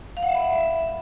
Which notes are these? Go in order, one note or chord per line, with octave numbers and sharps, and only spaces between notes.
F5
F#5
E5
B5
E5